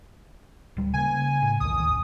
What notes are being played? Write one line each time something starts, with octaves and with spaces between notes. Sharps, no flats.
D1 G3
C#3 A#3 G#5
A2
B1 E2 D#3 D#6
A1 D#2